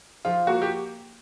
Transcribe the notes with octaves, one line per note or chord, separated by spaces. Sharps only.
F3 F4
A#3 F#4
G4